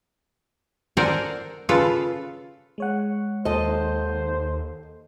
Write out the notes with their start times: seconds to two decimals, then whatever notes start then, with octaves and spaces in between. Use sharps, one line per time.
0.97 A4 A#4 C5 D5 F#5 G#5
1.69 C#3 F4 A4 B4
2.78 G#3 C#5 F#5
3.45 D#2 A4 C5 D#5